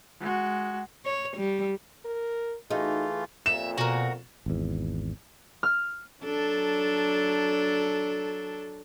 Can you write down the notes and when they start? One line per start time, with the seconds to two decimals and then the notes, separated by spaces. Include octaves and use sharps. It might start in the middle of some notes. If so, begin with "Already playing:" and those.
0.20 G#3 F#4
1.05 C#5
1.37 G3
2.05 A#4
2.71 E3 A3 D#4 F4 F#4 G#4
3.46 F2 A#2 E5 E7
3.78 B2 F#4 A#4
4.46 G#1 E2
5.63 F6
6.23 F#3 D4 A4